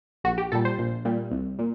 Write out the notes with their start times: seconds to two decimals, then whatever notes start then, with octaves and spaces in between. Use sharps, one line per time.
0.24 A#1 F#4
0.38 G4
0.52 A#2 G3 A4
0.65 C5
0.78 A#1
1.05 A#2 G3
1.31 C2
1.59 A#2